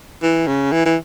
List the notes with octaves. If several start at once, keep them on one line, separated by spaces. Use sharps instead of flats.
E3
C#3
E3
E3